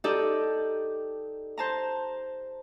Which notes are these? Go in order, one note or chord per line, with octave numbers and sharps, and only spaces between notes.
D#4 G4 A4 D5
C5 A5 A#5